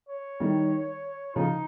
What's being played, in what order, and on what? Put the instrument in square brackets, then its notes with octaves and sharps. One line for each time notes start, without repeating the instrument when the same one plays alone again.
[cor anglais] C#5
[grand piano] D#3 G3
[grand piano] C#3 F3 [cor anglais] D#4